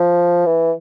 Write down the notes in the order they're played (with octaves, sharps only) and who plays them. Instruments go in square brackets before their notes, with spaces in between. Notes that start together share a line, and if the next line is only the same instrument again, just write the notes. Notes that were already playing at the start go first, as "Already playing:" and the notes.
Already playing: [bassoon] F3
E3